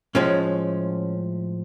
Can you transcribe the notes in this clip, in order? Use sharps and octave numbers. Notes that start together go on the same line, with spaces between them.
A2 F3 G#3 C#4